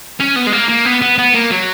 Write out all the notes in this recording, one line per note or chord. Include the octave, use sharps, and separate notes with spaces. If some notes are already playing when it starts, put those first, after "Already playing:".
C#4
B3
G#3
A#3
A#3
B3
B3
B3
A#3
F#3